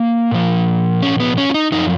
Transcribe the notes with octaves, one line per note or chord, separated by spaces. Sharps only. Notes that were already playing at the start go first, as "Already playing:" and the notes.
Already playing: A#3
A#2 F3
C#4
B3
C#4
F4
D#4
F#2 F3 D#4